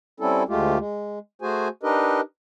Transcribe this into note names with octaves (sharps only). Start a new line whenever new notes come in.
G3 C4 C#4 E4 A4
D2 G#3 A3 F4 G4
G#3
A3 F#4 G#4 C5 G#5
D4 D#4 G4 A#4 B4 D#5